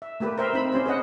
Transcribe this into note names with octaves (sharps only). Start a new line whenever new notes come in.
E5
A3 A#3 G4 B4
A#4 C5 E5 G5
C4 D#4 B5
B3 C#4 G4 C5
G#4 B4 D#5 F#5